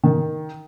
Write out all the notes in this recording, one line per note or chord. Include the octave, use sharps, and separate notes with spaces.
D#3